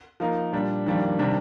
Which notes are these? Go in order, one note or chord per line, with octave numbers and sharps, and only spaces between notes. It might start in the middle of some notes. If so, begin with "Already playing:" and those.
F3 A#3 D#4 A#4
A#2 G3 D4
F2 D#3 G3 A#3 D4
C3 D#3 G3 D4